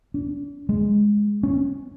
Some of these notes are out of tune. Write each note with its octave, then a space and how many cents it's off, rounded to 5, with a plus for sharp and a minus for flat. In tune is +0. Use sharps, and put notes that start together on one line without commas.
D4 -45
G#3 -5
C#4 -5